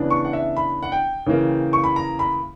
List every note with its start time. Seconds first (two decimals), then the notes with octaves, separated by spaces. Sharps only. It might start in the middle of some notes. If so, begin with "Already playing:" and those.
Already playing: C#3 E3 B3 D4
0.10 C#6
0.25 F#5
0.33 E5
0.57 B5
0.83 F#5
0.92 G5
1.26 C#3 E3 A#3
1.73 C#6
1.84 B5
1.96 A#5
2.19 B5